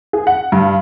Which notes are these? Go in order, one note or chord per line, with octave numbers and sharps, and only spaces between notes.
G#4
F#5
G2